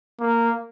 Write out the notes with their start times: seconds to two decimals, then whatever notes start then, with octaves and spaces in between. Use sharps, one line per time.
0.20 A#3